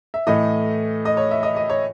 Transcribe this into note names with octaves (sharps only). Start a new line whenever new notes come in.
E5
A2 E3 A3 D#5
D#5
C#5
E5
D#5
D#5
C#5